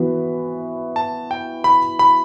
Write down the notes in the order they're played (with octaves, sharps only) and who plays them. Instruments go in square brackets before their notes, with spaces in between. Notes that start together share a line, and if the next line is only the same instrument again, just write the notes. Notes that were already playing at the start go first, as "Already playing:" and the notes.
Already playing: [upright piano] E3 B3 F#4 B4
[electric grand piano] A5
G5
B5
B5